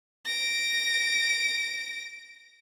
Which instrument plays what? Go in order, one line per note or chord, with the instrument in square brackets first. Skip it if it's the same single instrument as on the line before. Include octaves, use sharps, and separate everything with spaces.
[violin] A#6 D7